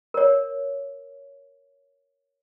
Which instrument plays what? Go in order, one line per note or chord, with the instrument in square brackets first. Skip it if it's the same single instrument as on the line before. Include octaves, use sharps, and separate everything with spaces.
[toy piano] A#4 C#5